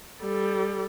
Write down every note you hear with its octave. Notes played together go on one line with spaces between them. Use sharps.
G3 A4